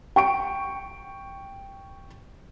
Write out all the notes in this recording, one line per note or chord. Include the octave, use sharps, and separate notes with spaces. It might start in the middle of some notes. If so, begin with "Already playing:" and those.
G5 C#6 D7